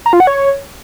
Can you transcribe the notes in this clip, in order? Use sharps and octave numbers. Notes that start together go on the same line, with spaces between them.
A#5
F4
F#5
C#5